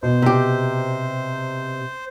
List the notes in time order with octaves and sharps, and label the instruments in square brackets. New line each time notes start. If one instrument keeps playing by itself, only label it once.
[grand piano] B2 [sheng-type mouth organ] C5
[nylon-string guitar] C3 G4